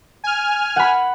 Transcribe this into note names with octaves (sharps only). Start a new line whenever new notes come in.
G#5 F6
F#5 B5